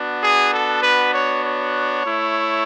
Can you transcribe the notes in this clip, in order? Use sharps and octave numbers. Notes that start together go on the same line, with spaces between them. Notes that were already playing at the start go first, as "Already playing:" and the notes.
Already playing: B3 D4 F#4
G#4
A4
B4
C#5
C#5
A3 E4